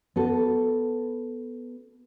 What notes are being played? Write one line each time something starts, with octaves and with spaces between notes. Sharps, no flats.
B3 F#4 A4